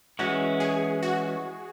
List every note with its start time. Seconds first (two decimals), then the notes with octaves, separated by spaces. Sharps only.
0.19 E3 G#3 C#4 F#4
0.60 G#4
1.03 F#4